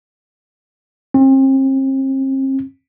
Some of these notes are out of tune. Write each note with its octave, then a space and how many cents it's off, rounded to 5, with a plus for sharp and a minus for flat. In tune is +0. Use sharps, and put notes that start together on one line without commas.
C4 +40